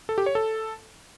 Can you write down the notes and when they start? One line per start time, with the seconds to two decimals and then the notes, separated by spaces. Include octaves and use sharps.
0.09 A4
0.18 G4
0.26 C#5
0.35 A4